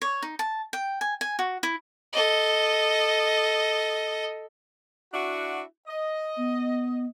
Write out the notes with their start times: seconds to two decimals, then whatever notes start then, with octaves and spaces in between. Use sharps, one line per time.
0.02 C#5
0.22 D#4
0.39 A5
0.73 G5
1.01 G#5
1.21 G#5
1.39 F#4
1.63 E4
2.12 A4 D#5
5.13 D4 E4 F#4
5.87 D#5
6.37 B3